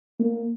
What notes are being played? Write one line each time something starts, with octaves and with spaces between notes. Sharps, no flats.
A#3